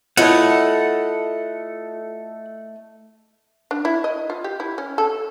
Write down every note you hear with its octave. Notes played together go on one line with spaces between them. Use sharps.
A3 E4 F4 A4 C#5 D#5 F#5
D4
E4
D#5
F4
G4
E4
C#4
A4